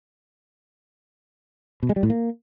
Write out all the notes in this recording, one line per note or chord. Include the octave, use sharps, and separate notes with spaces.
B2
G#3
G3
A2
A#3